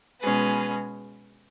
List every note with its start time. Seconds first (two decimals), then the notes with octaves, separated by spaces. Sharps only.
0.20 B2 G#3 C#4 G#4 B4